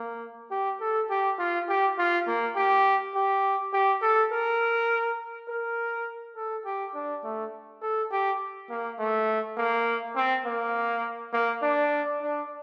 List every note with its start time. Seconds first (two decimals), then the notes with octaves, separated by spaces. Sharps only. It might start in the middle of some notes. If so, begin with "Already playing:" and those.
Already playing: A#3
0.51 G4
0.81 A4
1.10 G4
1.39 F4
1.69 G4
1.98 F4
2.27 A#3
2.56 G4
3.15 G4
3.73 G4
4.02 A4
4.32 A#4
5.48 A#4
6.36 A4
6.65 G4
6.95 D4
7.24 A3
7.82 A4
8.12 G4
8.70 A#3
8.99 A3
9.57 A#3
10.16 C4
10.46 A#3
11.33 A#3
11.62 D4
12.21 D4